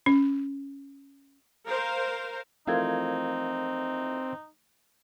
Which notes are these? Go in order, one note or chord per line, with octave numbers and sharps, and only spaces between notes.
C#4
A#4 C5 F5
E3 F3 A3 C4 D#4 A#4 F5 G#6